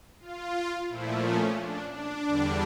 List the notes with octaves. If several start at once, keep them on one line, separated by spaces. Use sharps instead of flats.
F4
A#2 F3 A3 E4
C#4
D4
D4
E2 D3 G3